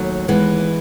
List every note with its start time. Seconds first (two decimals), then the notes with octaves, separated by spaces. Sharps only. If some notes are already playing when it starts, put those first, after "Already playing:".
Already playing: D#2 F#3 A3
0.28 E3 G#3 B3